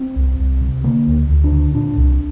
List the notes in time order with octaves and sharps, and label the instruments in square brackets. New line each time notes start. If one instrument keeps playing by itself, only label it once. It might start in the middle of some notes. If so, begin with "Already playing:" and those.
Already playing: [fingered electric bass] C4
C2
C2
C3
D3 A#3
D2
D2
D4
D3
A#2 D4
C2